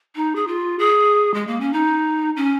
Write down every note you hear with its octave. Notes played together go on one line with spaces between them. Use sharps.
D#4
G#4
F4
G#4
G#3
A#3
C#4
D#4
C#4